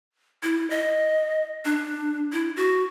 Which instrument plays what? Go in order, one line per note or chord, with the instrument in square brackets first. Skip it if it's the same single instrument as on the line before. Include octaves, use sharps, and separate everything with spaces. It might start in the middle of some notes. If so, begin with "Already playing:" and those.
[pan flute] E4
D#5
D4
E4
F#4